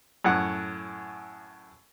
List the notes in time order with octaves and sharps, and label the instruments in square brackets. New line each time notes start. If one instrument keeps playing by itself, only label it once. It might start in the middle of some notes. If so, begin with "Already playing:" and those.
[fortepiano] F#2 A2 F#5